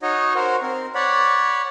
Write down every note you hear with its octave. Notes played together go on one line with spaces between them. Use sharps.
D#4 F#4 C#5 D#5
F#4 A#4 C5
C4 A#4
C#5 D5 F#5 B5